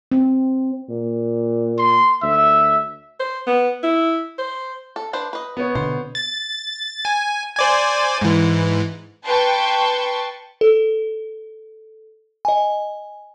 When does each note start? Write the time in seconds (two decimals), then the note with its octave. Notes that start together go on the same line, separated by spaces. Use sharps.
0.12 C4
0.89 A#2
1.78 C6
2.22 D2 E5
3.20 C5
3.47 B3
3.83 E4
4.38 C5
4.96 A4
5.13 D4 B4 C5
5.33 B4 D#5
5.57 B3 C#5
5.75 B2 D3 C5
6.15 A6
7.05 G#5
7.57 C5 D5 G#5
8.21 G#2 E3
9.26 B4 G5 A5 C6 C#6
10.61 A4
12.45 D#5 G#5